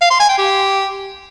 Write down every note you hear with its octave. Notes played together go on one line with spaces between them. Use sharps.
F5
C6
G#5
G5
G4